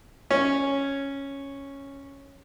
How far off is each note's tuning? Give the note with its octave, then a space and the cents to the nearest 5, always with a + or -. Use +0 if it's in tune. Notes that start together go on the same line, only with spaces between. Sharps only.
C#4 -5